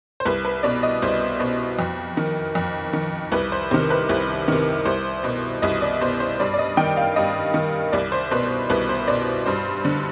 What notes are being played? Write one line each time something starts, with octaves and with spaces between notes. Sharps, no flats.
C5
C2 B4
B4
B2 D5
D#5
C2 C5
B2
F2
D#3
F2
D#3
C2 B4
C5
C3 D#3 C5
B4
C2
C3 D#3
C2 C5
B2
C2 D#5
D5
B2 C5
C5
G2 D5
D5
D#5
D#3 G5
F5
G2 D#5
D#3
C2 D5
C5
B2 B4
C2 B4
C5
B2 D5
G2 C5
D3